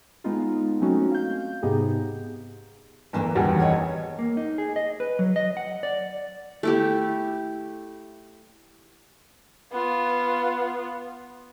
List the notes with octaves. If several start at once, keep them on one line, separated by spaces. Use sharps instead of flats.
G#3 B3 D#4 F4
F#3 A3 C4 C#4 D#4 F#4
F5 G6
G#2 C3 B3 D#4 G4 G#4
G1 D2 E3 A#3
F#1 E2 D#3 G3
C#5 D#5
A#3
D#4
G#4
D#5
B4
F#3
D#5
F#5
D5
A3 E4 G4
B3 F4